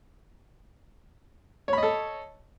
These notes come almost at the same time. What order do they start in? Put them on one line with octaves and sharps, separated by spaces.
C#5 B5 D#5 A4